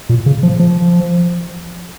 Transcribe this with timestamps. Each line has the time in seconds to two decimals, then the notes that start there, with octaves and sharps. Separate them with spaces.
0.09 A#2
0.26 C#3
0.43 F3
0.60 F3